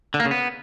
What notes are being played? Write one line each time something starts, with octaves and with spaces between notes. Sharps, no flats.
D3
A#3
C#3
B3